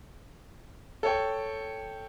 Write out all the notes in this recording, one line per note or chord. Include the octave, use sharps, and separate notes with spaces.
A4 C#5 G5